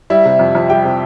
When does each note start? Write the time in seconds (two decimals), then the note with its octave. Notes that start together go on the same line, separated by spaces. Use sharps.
0.10 G3 E4 E5
0.25 C3
0.39 F2
0.55 F2
0.70 G3 G4 G5
0.85 C3